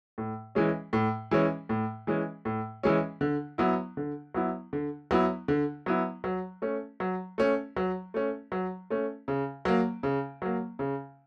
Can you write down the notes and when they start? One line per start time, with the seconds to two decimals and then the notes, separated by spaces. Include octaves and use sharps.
0.18 A2
0.55 E3 G#3 C#4
0.93 A2
1.31 E3 G#3 C#4
1.69 A2
2.07 E3 G#3 C#4
2.45 A2
2.83 E3 G#3 C#4
3.21 D3
3.58 F#3 B3 E4
3.97 D3
4.34 F#3 B3 E4
4.73 D3
5.11 F#3 B3 E4
5.48 D3
5.86 F#3 B3 E4
6.24 F#3
6.62 A3 C#4
7.00 F#3
7.38 A3 C#4
7.77 F#3
8.14 A3 C#4
8.52 F#3
8.90 A3 C#4
9.28 C#3
9.65 F#3 A#3
10.03 C#3
10.42 F#3 A#3
10.79 C#3